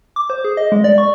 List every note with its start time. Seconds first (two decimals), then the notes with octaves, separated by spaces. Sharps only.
0.16 D6
0.30 C5
0.44 G#4
0.57 D#5
0.72 G#3
0.84 D5
0.98 C#6